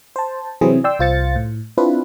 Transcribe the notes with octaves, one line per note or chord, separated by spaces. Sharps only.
C5 A5
C3 E3 F#3 C4 E4 G#4
D5 G5 C6 E6
C2 F4 C5 A6 C#7
A2
C4 D4 E4 F4 B4